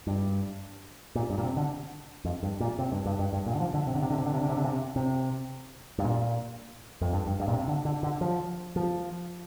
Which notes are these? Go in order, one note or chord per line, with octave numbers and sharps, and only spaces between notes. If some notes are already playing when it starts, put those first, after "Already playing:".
G2
A#2
G2
A#2
C3
D3
F2
G2
A#2
C3
G2
G2
G2
G2
A#2
D3
F3
D3
C3
D3
C3
D3
C3
D3
C3
D3
C3
D3
C3
C3
G2
A#2
F2
G2
G2
G2
A#2
C3
D3
D3
D3
F3
F3